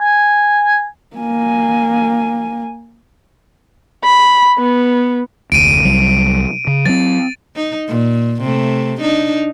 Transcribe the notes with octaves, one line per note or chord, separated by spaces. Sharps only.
G#5
A#3 G#5
B5
B3
F1 D2 D7 D#7
C2 F#3 G3
C#3
F#3 C4 A6
D#4
A#2
C3 A3
D4 D#4